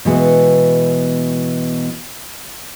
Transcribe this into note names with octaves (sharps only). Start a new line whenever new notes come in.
B2 E3 G#3 B3